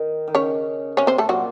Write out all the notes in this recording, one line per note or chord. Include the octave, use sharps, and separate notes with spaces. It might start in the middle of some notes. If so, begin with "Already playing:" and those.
Already playing: D#3
D#3
C#3 C#4 C#5
C3 C#4 C#5
C4 C5
A3 A4
A#2 F#3 F#4